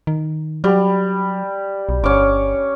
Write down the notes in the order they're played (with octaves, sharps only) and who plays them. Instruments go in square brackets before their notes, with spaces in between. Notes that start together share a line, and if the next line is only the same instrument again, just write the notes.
[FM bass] D#3
[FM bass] F#3 [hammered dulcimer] G3
[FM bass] B1
[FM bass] G1 [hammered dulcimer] C#4 D6